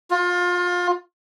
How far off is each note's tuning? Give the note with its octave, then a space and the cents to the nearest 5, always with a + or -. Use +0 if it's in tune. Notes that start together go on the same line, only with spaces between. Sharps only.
F4 +25